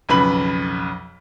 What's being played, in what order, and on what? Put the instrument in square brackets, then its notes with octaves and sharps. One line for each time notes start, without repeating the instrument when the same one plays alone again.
[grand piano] B1 F2 C#3 B4 B5 F#7